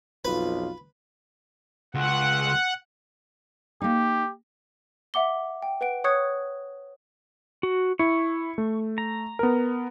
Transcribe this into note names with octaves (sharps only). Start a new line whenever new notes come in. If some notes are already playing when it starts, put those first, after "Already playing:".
B1 F2 F4 B4
C#2 F#5
A#3 D#4 G4
E5 F#5 D6 G7
G5
B4 F#5 D7
C#5 C#6 D#6 F#6 G#6 C#7
F#4
E4 C#6
A3
A#5
B3 A#4